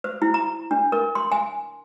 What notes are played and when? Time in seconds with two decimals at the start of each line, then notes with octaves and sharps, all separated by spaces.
0.04 C5
0.22 E4
0.34 A#5
0.71 D4
0.92 A#4
1.15 C6
1.32 G#5